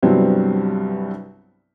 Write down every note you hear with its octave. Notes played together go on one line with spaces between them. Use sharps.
C2 G2 F#3 G3 B3 C4